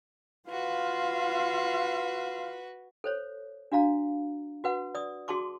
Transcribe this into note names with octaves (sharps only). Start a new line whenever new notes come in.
F4 F#4 B4 F5
A4 C5 C#5
D4 F#4 F5 A#5
F#4 B4 F#5
D5 D#6
F#4 G#4 A5 C6 D6